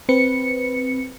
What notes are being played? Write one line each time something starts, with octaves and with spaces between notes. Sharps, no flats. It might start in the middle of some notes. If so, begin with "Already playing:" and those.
C4 B4 C#7